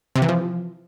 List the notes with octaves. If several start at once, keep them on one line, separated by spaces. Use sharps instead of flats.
C3
E3
F3